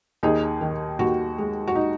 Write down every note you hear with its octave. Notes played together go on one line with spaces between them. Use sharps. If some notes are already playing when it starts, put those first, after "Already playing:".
D#2 D#4 G#4
D#3
D#2 F#4
G#3
F#4
D#4